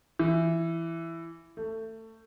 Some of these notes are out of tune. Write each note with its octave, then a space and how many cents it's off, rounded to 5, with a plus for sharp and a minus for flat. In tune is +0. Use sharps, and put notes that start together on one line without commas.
E3 +10
A3 +20